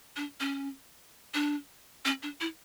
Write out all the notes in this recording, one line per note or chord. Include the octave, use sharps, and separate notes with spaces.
D4
C#4
D4
C#4
D4
E4